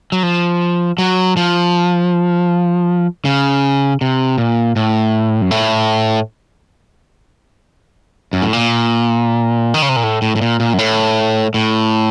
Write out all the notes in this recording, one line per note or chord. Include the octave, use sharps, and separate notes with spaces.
F#3
F3
F#3
F3
C#3
C3
A#2
A2
F#2
A2
F#2
A2
A#2
D#3
C#3
C3
A#2
A2
A2
A2
A#2
A#2
F#2
A2
A2